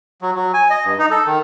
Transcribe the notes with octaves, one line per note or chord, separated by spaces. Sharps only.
F#3
F#3
G#5
D#5
G2
D#4
A4
D#3